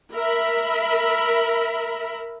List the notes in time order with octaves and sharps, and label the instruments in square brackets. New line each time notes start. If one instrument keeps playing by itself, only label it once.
[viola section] A#4 E5 B5